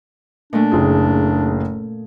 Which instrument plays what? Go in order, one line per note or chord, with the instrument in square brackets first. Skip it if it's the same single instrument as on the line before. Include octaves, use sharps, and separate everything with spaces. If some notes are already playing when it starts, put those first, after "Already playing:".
[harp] A#2 A3 [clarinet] D4
[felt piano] F#1 G#4